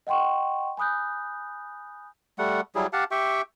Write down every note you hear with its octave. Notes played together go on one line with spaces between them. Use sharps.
D#5 F#5 G5 C6 C#6
G#5 B5 D#6 F#6 G6
G3 A3 F#5
F#3 G3 E4 G#4
G4 F5 F#5 A5
G4 E5 G5 C#6